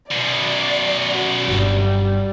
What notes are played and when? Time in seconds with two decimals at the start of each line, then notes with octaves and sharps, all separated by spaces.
0.11 F#2 B2 D5
1.11 F#4
1.48 G1 G2 G3